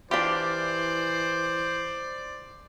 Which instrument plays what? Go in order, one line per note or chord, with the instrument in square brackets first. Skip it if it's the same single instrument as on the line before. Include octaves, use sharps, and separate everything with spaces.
[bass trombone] E3 [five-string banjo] D4 F4 G4 [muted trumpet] C5 [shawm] D5